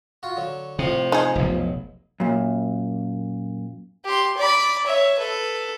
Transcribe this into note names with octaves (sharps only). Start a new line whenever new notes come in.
F4 F#4
D3 F#3
F2 A2 C3 F3
D#4 G#4
F1 B1
F#2 A#2
G4 C6
D5 B5
C#5 E5
A4 B4